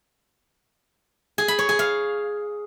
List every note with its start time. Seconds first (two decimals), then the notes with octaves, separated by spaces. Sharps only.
1.38 G#4
1.48 B5
1.59 C#5
1.69 G#4
1.79 F5